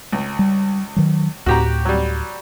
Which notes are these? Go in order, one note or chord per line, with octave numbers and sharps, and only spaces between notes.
C#2
G3
D#3 F#3
D2 A2 F#4 G4 A#5
F#3 G3